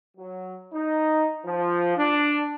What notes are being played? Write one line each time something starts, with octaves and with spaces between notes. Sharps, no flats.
F#3
D#4
F3
D4